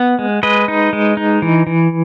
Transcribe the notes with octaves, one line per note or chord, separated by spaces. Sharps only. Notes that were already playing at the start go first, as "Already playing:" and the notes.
Already playing: B3 F#5
G#3
G#3 B4 D#5
D#4
G#3
D#4
E3
E3